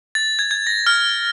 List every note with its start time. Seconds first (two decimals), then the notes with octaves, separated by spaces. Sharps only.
0.15 A6
0.39 G#6
0.51 G#6
0.67 A#6
0.87 F6